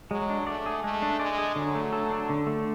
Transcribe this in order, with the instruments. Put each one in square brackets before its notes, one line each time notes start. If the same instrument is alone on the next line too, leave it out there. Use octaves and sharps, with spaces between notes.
[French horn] F#3 [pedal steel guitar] G#3
[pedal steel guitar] D4
[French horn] A3 [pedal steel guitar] D5
[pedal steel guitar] G#4
[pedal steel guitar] G#3 [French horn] A3
[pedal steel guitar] D4
[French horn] G#3 [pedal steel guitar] D5
[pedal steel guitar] G#4
[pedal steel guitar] D3 [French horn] F#3
[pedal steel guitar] A3
A4
D4
D3
A3